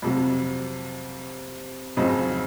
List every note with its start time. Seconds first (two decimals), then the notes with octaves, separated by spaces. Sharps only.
0.02 F2 C3 F#3
1.96 F2 C#3 F#3 C4 D#4